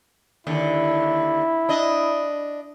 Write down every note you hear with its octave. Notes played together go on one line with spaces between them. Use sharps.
D#2 D3 E4
D4 D#5